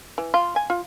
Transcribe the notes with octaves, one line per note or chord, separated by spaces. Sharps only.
E3
F4
G#5
F4